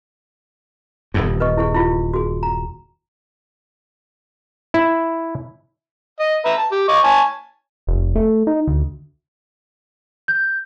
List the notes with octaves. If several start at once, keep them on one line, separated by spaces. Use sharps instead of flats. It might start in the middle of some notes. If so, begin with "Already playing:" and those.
D#1 E2 G2
B4 D#5 C#6
E4 G#4 C#6
E4 F4 G4
F#4 G#4
A#5
E4
D#5
B4 E5 A#5
A5
G4
D#5 C#6 D6
C#5 G#5 A5
F1
A3
D#4
D2
G6